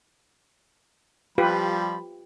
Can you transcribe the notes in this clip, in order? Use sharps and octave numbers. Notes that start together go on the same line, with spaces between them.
F3 G3 F4 G4 B4 B5